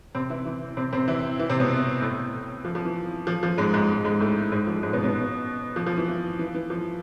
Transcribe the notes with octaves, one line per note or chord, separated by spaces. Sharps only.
C3 C4
E3 E4
E3 E4
C3 C4
C3 C4
E3 E4
E3 E4
C3 C4
B2 B3
A2 A3
F3
F3
E3
F3
F3
G#2 G#3
G#2 G#3
G#2 G#3
A2 A3
G#2 G#3
F3
G#2 G#3
B2 B3
B2 B3
F3
F3
E3
E3
E3
E3
F3